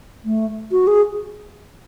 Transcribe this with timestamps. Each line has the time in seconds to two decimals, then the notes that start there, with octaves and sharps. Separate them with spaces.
0.25 A3
0.71 F#4
0.87 G#4